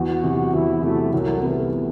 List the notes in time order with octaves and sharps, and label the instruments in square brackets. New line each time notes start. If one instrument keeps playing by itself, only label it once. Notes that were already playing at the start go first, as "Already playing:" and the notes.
Already playing: [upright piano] E2 [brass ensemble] F#4
[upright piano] C3 F#3
[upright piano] E2 [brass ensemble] E4
[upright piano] C3 F#3 [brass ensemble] A3
[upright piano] C2 [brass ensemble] F#3
[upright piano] C3 E3 B3 [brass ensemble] A3